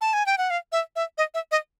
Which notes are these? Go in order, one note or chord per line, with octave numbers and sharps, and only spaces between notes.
A5
G#5
G5
F#5
F5
E5
E5
D#5
E5
D#5